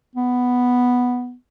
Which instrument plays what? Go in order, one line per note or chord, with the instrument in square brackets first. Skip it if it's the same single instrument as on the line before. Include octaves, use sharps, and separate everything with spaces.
[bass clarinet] B3